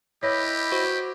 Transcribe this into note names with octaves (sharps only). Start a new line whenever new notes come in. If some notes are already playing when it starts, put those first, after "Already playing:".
E4 G4 B4 C#5 D#5
F#4 C5